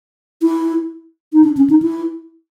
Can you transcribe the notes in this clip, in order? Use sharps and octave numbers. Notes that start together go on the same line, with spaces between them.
E4
D#4
D4
C#4
D#4
E4